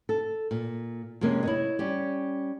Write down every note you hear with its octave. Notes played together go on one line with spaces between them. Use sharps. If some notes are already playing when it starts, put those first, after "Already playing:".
A4
A#2
F2 C3 G#3 A#3 C#4
E4 C#5 D#5
G3 C#4 G4